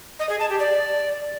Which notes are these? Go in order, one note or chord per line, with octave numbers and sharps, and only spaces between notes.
D#5
G#4
A5
G4
D5